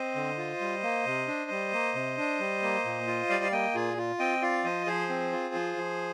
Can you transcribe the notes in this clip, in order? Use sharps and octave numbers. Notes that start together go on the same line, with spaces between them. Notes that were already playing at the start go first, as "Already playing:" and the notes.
Already playing: C4 C5 D#5
D3
F4
G3
A#3
C3
D4
G3
A#3
C3
D4
G3
A#3
A#2
F4
G3 D5 F5
F5
A#3 D#5 G5
A#2 F4 G#4
F4
C4 D#5 G5
F4 D5 F5
F3 C5 D#5
F3 G#4 C5
C4
F4
F3
F3